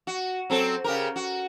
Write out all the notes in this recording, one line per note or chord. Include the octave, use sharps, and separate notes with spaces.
F#4
F#3 C4 A4
C#3 G4 A#4
F#4